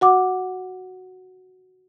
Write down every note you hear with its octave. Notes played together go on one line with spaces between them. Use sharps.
F#4 F#5 D6